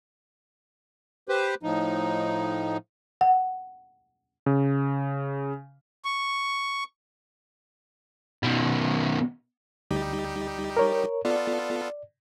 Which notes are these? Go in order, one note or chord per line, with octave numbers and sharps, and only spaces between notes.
G4 B4 C5
A2 F3 D#4
F#5
C#3
C#6
B2 D#3
D2 G3 D#4 G4
A#4 C#5
B3 F4 A4 D5